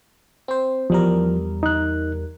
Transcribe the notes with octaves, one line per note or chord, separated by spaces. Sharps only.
C4 C5
E2 F3 G3 A#4
D#4 F#6